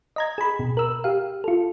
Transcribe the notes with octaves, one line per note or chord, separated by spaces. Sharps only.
D#5 A#5 G#6
G#4 B5
B2
A#4 E6
G4 F5
F4 A4